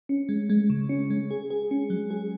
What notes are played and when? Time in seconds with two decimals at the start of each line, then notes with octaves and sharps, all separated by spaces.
0.09 C#4
0.29 G#3
0.50 G#3
0.70 C#3
0.89 C#4
1.10 G#3
1.31 G#4
1.50 G#4
1.71 C#4
1.90 F#3
2.10 G#4